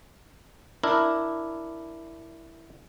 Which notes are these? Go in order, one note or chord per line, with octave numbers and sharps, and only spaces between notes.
D4 E4 A#4